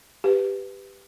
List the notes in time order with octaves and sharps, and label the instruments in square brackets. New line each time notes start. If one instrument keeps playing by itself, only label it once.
[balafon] G4 B4